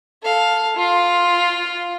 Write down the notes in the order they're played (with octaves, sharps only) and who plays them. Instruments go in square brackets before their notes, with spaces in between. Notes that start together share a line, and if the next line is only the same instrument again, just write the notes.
[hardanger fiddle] A4 F5
F4